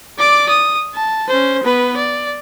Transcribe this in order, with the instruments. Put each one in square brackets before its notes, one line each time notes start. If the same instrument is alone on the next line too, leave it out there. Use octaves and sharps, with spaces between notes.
[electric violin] D5 D6
D#6
A5
C#4 C5
B3 B4
D5